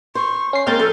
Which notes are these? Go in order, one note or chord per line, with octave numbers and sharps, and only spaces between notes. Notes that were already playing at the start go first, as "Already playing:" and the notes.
C5 C#6
C#4 C7
G#3 A#3 C4 A#4 F6 G6 A6
F3 A4 A#4